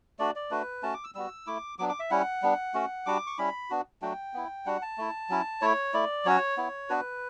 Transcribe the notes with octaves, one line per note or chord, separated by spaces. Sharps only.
A3 D4 F#4 D5
D5
A3 D4 F#4 B4
A3 C#4 F#4 A5
D6
E6
G3 B3 F#4 E6
A3 E4 D6
F#3 B3 D4 D6
D6
E5
G3 C#4 E4 F#5
G3 B3 D4
A3 C#4 F#4
G3 D4 F#4 D6
C#6
G3 C#4 E4 B5
B3 D4 F#4
F#3 A3 D4 F#4 G5
B3 E4
G3 D4 F#4 F#5
A5
A3 E4
F#3 C#4 E4
A3 E4 C#5
A3 E4 D5
F#3 C#4 F#4 C#5
B3 E4
B3 D4 F#4 B4